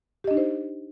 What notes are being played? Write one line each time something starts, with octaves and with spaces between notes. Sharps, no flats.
D4 D#4 G4 C5 D#5